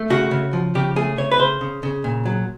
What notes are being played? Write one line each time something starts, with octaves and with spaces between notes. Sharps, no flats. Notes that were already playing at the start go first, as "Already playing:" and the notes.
Already playing: A3
C#3 F#4
C#3
F3
C#3 G4
A3 G#4
C#3 C#5
B4
C#3 C5
C#3
C#3
A#2
F#3